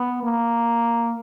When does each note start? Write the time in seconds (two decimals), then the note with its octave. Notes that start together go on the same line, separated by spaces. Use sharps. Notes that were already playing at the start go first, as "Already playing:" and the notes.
Already playing: B3
0.23 A#3